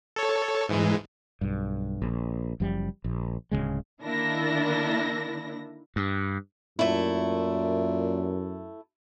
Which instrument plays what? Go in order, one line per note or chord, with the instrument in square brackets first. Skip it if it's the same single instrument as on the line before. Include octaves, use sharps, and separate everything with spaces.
[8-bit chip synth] A4 C#5
G#2 E3 G#3
[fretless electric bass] B1 G2
A#1
F#1 F#2 F3 G3
A#1
D1 E2 C#3 G#3
[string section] D3 D#3 A#3 D4 E4 A#6
[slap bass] G2
[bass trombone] F#2 [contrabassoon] A#2 [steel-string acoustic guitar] A3 E4